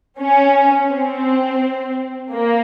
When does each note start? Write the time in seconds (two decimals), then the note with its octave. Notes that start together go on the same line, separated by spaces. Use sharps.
0.20 C#4
0.91 C4
2.33 A#3